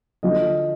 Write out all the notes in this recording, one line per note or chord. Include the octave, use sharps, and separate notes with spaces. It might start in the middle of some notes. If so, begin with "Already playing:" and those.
D3 F3 D#5